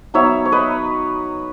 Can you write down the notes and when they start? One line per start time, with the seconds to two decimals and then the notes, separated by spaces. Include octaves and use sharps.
0.14 F#3 B3 D#4 C#5 E5
0.45 C#5
0.52 B4 D#5